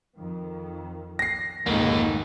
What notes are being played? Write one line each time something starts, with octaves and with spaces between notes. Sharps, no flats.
F2 D#3
A#6 C7
F1 C#2 G#2 D#3 A#3 D#4